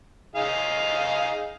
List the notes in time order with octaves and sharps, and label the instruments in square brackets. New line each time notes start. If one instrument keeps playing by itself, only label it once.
[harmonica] D#4 G#4 F5